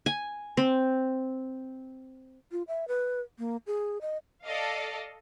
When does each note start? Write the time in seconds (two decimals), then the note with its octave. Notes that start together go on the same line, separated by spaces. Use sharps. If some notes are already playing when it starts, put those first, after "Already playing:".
0.06 G#5
0.57 C4
2.52 F4
2.68 E5
2.88 B4
3.39 A#3
3.67 G#4
4.01 D#5
4.44 A4 D5 D#5 F5